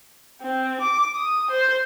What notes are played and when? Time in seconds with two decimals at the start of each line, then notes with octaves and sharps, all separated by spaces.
0.41 C4
0.81 D6
1.15 D#6
1.50 C5